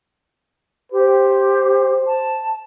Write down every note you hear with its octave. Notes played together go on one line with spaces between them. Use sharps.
G4 C5
A5